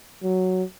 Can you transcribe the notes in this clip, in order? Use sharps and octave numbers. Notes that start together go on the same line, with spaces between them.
F#3